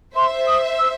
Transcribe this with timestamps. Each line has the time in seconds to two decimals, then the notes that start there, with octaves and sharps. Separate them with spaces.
0.16 C5 E5 C6
0.47 D#6
0.78 E6